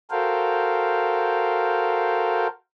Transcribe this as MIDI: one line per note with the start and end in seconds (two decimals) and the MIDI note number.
0.11 2.47 66
0.11 2.47 69
0.11 2.47 70
0.11 2.47 72
0.11 2.47 77
0.11 2.47 79